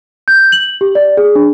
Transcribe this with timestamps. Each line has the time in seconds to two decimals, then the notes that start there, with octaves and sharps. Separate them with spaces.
0.28 G6
0.52 F#7
0.81 G4
0.95 D5
1.17 G#4
1.35 D4